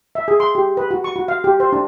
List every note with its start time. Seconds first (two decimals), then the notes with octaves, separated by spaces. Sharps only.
0.15 E5
0.28 G#4
0.40 C6
0.55 G4
0.77 B4
0.91 F#4
1.04 C#6
1.16 F#4
1.28 F5
1.44 G4
1.60 C5
1.73 D4